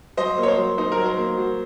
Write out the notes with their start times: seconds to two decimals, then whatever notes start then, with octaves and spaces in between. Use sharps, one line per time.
0.17 F#3 C5 D#5
0.38 A#3
0.43 C#5
0.48 C5
0.57 F#3
0.78 D#4 C5
0.92 A#4
0.97 F#3
1.05 C5
1.17 A#3
1.38 F#3